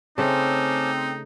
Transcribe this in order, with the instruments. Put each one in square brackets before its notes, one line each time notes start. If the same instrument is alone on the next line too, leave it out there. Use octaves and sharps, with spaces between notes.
[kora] C#3 A3 [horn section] C4 [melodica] C#4 A5 D6 [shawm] D#4